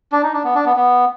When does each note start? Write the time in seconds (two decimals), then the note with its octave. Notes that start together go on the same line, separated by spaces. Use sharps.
0.12 D4
0.23 D#4
0.33 D4
0.44 B3
0.55 D4
0.66 B3
0.76 B3